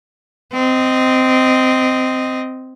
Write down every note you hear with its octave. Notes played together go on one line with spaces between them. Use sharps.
C4 D#5